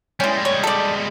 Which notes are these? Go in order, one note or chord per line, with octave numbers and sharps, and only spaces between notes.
E3 G3 G#3 C#4
C#5
A4 D5